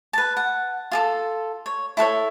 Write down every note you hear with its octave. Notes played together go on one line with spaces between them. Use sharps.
B4 A5
F#5
F4 G#4 A4
C#5
E4 A4 B4 C#5